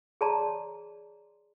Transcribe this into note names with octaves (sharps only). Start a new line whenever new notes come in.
G#4 C#5 D5 A5 A#5 C6